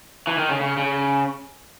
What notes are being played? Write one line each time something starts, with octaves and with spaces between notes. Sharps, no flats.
E3
D#3
C#3
C#3
C#3